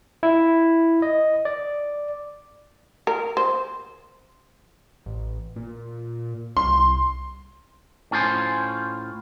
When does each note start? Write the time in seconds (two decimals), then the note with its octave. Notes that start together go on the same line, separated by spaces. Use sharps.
0.23 E4
1.02 D#5
1.45 D5
3.07 A#4
3.37 C5
5.06 A1
5.56 A#2
6.57 C2 C6
8.11 A2 C#4 F4 G4 C5 G#5